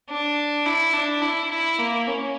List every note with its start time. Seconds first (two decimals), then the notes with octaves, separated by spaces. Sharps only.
0.09 D4
0.66 E4
0.93 D4
1.22 E4
1.51 E4
1.78 A#3
2.07 C#4